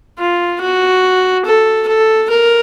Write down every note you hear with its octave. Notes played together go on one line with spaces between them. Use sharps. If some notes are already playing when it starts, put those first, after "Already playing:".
F4
F#4
A4
A4
A#4